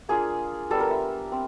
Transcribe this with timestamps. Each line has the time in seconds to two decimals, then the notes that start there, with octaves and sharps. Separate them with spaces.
0.09 A#3 D4 F4 G#4
0.70 G3 B3 D4 A4
0.80 A#4
0.90 E5
1.32 C4